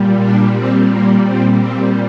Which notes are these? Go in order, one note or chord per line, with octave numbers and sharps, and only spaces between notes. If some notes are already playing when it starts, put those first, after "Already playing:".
Already playing: A#2 G3
D4
C4
A#3
A#2 G3 C4
C4